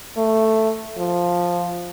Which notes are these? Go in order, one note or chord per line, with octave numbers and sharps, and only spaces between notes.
A3
F3